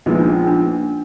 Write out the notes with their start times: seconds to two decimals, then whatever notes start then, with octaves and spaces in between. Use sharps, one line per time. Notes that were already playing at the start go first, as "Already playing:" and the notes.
0.06 A#1 A#2 F3 G#3 B3 D#4
0.19 D4
0.33 C#4
0.47 D4